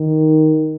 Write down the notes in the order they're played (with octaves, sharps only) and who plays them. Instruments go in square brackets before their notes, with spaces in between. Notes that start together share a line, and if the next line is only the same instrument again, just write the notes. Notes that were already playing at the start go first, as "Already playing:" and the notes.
Already playing: [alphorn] D#3